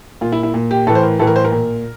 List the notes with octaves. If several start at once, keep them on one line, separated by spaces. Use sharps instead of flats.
A#2 F4
E4
E4
A#2
G4
A2 E3 A4
C5
A#4
A2 E3 A4
A#4
C5
A#4
A#2